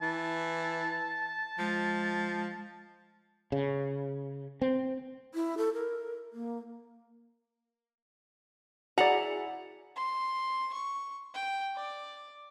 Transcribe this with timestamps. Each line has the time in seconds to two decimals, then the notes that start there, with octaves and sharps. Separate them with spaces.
0.02 E3 A5
1.59 F3 G#3
3.52 C#3
4.62 C4
5.35 E4
5.58 A4
5.73 A#4
6.33 A#3
8.98 E4 F#4 G#4 D5 F#5 A#5
9.96 C6
10.73 C#6
11.34 G5
11.76 D5